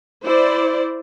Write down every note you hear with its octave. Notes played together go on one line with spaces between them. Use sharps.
E4 C5 D5